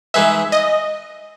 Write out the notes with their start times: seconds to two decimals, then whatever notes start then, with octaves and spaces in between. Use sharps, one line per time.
0.14 E3 G#3 D#4 G#4 B4 E5
0.52 D#5